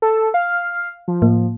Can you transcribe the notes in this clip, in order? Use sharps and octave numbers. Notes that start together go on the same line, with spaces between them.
A4
F5
F3
A2 A#3